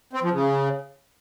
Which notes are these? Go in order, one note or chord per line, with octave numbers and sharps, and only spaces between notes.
C4
F3
C#3